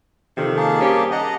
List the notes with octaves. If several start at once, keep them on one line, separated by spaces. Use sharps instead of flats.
F2 C3 D#3
A#3 G#4 A5
G3 C#4 G4
D#5 F#5 A5 A#5